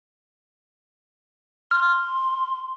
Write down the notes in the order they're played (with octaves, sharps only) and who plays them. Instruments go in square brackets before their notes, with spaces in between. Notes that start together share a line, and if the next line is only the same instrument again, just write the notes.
[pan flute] C6 [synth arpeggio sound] F6